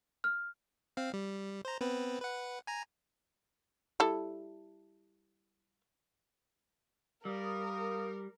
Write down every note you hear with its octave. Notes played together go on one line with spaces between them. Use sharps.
F6
C4 F5
G3
C5 A#5
B3 C4 B4
B4 F#5
G#5 A#5
G3 E4 A4
G3 A#4 F5 D#6